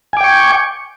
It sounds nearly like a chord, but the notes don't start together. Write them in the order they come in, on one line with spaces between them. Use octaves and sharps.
G#5 D6 G5 C#6